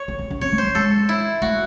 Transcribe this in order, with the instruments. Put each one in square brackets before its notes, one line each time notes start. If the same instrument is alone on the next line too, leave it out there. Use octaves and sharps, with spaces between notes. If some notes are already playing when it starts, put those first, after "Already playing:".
Already playing: [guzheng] C#5
[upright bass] C4
C4
C#4
[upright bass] C4 [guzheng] C#5
[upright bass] A3
[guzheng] C5
[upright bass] G#3
[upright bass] G#3 [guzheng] A4
[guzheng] E4
[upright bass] A3 [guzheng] F#4